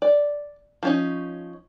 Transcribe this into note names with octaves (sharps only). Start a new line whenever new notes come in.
D5
F3 C#4 D#4